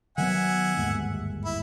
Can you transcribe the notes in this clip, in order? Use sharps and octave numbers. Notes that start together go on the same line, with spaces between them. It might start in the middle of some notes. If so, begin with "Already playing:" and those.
D#3 F#3 B3 E5 F#5 G#5
G1 D#2 G#2
E4